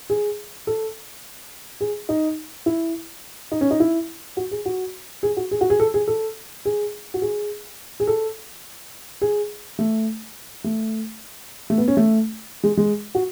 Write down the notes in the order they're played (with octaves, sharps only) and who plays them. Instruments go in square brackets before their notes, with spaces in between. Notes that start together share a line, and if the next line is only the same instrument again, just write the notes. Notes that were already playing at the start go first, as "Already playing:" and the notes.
[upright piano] G#4
A4
G#4
D#4
E4
D#4
C#4
D#4
E4
F#4
G#4
F#4
G#4
F#4
G#4
F#4
G#4
A4
G#4
A4
G#4
F#4
G#4
G#4
A4
G#4
A3
A3
A3
B3
C#4
A3
G#3
G#3
F#4